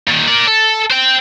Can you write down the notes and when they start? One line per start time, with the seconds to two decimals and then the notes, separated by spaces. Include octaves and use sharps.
0.07 A#2 D#3
0.27 A#4 D5
0.47 A4
0.90 C5 G5